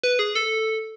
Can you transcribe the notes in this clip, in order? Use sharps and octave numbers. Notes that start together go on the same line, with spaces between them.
B4
G#4
A4